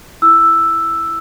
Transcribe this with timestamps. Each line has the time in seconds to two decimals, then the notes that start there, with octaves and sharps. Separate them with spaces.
0.22 E4 E6